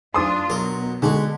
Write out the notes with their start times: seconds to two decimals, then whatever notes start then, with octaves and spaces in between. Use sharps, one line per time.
0.14 F#2 D4 F4 C6 D#6
0.50 B2 F#3 A#4
1.02 D3 G#3 F#4